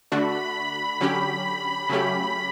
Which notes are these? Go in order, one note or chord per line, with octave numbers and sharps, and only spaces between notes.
D3 A3 D4 F#4 B5
D3 F#3 C#4 G4
C#3 F#3 A3 C#4 G4 B5